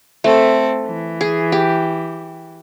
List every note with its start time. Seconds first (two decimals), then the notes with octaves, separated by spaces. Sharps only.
0.24 A3 C4 A4
0.86 E3
1.21 G#4
1.52 G4